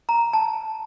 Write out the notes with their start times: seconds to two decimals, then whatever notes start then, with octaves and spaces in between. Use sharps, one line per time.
0.09 A#5
0.33 A5